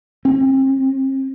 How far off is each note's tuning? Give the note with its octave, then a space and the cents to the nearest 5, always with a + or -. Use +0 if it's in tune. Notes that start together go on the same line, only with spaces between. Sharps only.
C4 +40